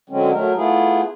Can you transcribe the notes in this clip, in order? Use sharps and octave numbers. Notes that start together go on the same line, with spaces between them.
D3 F#3 G#3 C4 C#4
F#3 A3 A#4
A3 B3 E4 F4 G#4